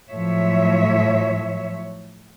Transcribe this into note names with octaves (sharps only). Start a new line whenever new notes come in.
A2 F3 F#3 C#5 E5